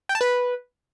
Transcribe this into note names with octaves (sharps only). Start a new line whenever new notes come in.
G5
A5
B4